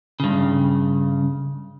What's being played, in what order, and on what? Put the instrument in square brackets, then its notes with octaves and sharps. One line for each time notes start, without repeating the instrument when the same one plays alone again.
[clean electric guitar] G2 C#3